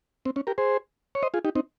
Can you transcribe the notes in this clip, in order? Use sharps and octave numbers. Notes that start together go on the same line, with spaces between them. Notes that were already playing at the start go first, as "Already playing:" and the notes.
C4
C#4
G4 A#4
G#4 C5
C#5
C5 D#5
F4 G#4
D#4 G4
C4 D#4